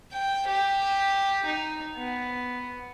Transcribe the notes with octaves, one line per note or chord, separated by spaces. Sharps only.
G5
G4
D#4
B3